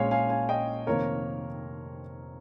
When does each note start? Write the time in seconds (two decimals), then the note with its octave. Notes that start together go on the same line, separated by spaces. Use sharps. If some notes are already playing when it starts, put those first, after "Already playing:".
Already playing: A#1 A#2 G#3 C#4 C#5 F5 G#5
0.11 F5 G#5
0.30 F5 G#5
0.49 D#5 G5
0.87 F1 F2 D#3 A#3 A#4 C#5